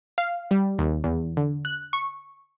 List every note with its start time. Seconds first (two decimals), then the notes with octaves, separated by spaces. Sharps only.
0.18 F5
0.51 G3
0.79 D#2
1.04 E2
1.37 D3
1.65 F#6
1.93 C#6